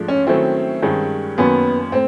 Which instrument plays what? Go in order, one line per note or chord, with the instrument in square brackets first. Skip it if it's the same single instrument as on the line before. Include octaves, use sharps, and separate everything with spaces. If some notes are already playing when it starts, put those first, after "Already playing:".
Already playing: [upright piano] G#2 F3 A3 D4
[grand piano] C#4
[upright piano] D#3 F#3 A3 C#4 E4 [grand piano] C4
[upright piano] G2 D#3 G#3 C#4
[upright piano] F#2 D#3 F#3 A#3 C#4 [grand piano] B3
[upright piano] A2 [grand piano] C4